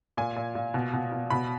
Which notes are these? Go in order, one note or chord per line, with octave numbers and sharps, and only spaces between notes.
A#2 G#5
A#2
A#2
B2
B2
B2
B2 B5